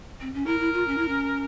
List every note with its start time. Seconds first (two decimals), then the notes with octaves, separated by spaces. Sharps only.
0.20 C4
0.34 C#4
0.46 E4 A#4
0.60 E4
0.74 F4
0.87 C#4
0.98 E4
1.08 C#4